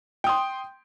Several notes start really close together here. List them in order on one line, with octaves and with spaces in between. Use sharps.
G5 D#6 C6